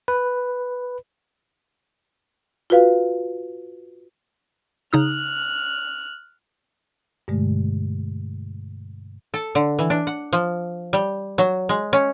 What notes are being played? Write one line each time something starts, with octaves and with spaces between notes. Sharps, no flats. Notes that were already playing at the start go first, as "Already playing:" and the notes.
B4
F4 F#4 B4 F5
C#3 D#4 D#6 F6 F#6
G2 B2 D3 G#3 A3
A4
D3
E3
D4
F#5
F3
G3
F#3
G#3
C#4